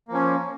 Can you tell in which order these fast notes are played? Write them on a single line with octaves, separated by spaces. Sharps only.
A#3 F3 C#4